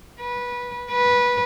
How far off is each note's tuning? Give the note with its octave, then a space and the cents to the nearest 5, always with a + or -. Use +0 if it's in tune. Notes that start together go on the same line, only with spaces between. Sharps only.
B4 -15
B4 -15